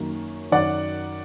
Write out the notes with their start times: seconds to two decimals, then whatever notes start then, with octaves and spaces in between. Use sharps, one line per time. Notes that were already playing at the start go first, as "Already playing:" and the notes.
Already playing: F#2 D#3 F#3 A#3
0.52 F#2 D#3 F#3 D5 F#5